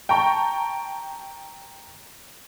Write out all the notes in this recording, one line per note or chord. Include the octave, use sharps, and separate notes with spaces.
G5 A5 A#5 C#6